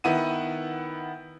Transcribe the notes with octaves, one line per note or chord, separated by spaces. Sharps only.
D#3 B3 E4 F#5 D#7